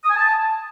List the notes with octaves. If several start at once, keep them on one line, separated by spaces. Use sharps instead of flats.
D#6
G#5
A5